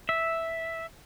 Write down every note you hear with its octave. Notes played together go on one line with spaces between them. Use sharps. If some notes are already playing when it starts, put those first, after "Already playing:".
E5